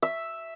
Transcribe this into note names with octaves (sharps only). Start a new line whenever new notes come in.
E5